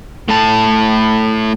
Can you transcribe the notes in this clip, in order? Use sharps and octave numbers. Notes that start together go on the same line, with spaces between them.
A2 A5